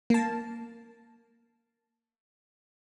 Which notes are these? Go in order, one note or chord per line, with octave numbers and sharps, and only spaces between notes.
A#3 A5